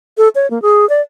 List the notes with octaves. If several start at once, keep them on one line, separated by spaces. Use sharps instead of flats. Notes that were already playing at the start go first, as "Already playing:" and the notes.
A4
C#5
A#3
G#4
D5